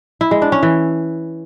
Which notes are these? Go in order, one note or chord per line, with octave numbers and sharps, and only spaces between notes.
E4
G#3
D4
C#4
E3